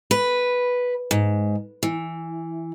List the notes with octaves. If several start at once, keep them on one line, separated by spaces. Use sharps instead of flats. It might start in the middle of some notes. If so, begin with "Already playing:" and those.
B4
G#2
E3